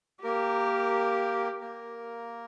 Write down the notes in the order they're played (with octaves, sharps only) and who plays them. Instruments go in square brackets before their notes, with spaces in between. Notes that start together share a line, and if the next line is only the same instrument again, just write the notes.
[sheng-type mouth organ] A#3 A#4 [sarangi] G4
[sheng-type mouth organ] A#3 A#4